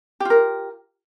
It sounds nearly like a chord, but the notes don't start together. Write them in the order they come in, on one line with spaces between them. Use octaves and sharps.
G4 F4 A#4